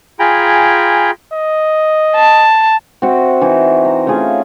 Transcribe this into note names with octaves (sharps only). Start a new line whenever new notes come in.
F4 G#4 G5 G#5 A#5 B5
D#5
A5
C4 F#4 E5
E3 D#4 E4
A#5
A3 C#4 F4 G#4